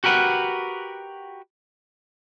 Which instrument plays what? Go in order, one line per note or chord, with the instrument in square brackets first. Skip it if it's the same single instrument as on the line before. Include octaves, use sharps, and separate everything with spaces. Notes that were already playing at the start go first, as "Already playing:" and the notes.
[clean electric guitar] F#4 G4 A#4 B4 F#5